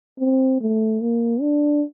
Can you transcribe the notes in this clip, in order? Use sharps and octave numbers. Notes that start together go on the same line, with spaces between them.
C4
A3
A#3
D4